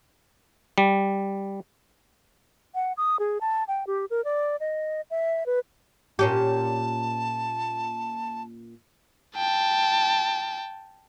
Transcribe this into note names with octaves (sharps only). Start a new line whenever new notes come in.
G3
F#5
D#6
G#4
A5
G5
G4
A#4
D5
D#5
E5
B4
A#2 C#4 G4 A5
G5 A5